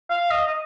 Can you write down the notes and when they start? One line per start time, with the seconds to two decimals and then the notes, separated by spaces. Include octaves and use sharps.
0.10 F5
0.31 D#5
0.47 D#5